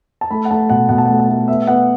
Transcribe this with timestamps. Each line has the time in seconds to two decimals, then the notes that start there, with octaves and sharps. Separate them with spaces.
0.21 A5
0.31 A3 B5
0.45 F#5
0.50 A3 A5
0.70 B2 F#5
0.89 B2 F#5
0.98 A5
1.06 A3 F#5
1.19 A5
1.29 A3
1.48 B3 E5
1.67 B3 F#5